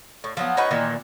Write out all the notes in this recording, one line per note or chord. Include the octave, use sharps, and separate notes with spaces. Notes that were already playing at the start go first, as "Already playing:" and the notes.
A2
F3 F#3 B3
C#4 D#4 F#4 B4
A#2 D#3 E3